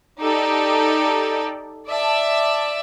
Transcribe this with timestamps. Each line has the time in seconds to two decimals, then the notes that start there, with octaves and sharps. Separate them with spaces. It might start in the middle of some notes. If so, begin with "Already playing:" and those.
0.20 D#4 G4 A4 D5
1.87 D5 E5 A5